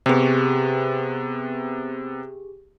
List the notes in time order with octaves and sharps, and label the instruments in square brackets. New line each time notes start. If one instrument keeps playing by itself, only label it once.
[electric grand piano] C3 B3 [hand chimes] G4 G#4